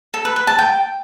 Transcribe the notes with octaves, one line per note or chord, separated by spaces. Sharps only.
A4
B4
B4
A5
G5